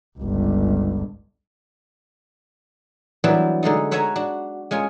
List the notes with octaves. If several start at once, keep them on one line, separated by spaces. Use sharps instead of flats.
G1 C#2
E3 F#3 G3 B3 D4 E4
D3 G#3 A3 D#4
B4 C#5 E5 F#5 G#5 A#5
D4 F#4
G#3 C#4 F4 G#5